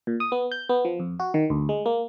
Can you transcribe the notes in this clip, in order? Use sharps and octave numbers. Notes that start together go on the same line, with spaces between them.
A#2
D#6
B3
G6
B3
F3
F2
F#4
D#3
D2
G#3
A#3